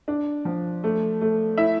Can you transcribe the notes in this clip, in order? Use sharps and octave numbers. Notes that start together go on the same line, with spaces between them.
D4
F3
A3
A3
E4 E5